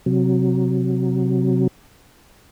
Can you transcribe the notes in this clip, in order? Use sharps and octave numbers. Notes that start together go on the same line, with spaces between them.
C3 F#3